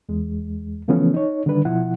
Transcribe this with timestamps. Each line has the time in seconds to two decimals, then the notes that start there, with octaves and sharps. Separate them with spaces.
0.09 E2 G#3
0.88 C#3 E3 F3 A3 B3 C#4
1.14 D#4 C#5
1.46 D3 D#3 G3 D4 B4
1.65 B2 F3 E4 F#5